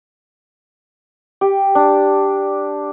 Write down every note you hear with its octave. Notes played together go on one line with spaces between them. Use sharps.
G4
D4